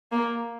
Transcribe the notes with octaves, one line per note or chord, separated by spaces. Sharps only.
A#3